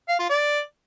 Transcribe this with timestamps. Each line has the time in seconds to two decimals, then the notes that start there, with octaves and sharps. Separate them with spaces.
0.09 F5
0.19 F4
0.30 D5